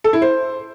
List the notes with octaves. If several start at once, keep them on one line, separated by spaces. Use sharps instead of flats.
A4
E4
C5